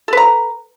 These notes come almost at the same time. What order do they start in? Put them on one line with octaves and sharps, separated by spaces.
A4 B4 A#5